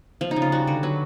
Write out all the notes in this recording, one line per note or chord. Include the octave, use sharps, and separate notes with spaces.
F3
D#4
C#3
F4
G3 F#4
D3 F#4
F#3 B4